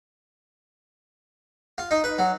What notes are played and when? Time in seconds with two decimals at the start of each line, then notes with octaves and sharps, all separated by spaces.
1.78 F4
1.91 D#4
2.04 B4
2.18 F#3